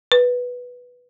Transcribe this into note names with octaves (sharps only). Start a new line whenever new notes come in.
B4